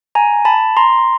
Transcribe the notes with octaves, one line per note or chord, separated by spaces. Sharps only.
G#5 A#5
A5 B5
A#5 C6